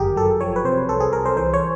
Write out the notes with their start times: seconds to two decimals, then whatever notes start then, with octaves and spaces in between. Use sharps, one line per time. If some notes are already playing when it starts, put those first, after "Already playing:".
Already playing: G1 F#2 D#3 G4 G#4 A#4
0.16 F#3 A4
0.41 F3 C#5
0.56 B4
0.64 C3 C5
0.89 C2 A4
1.00 G#4
1.12 C2 A#4
1.25 C5
1.37 E3 C5
1.53 C#5